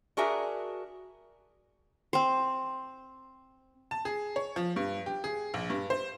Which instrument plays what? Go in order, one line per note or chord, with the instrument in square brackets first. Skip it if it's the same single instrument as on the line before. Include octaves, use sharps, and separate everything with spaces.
[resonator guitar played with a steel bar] D4 F#4 G#4 A#4 E5
[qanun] C4 C5
[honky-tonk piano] A5
G#4
C#5
F3
G2
G4
G#4
A#1
G2
C5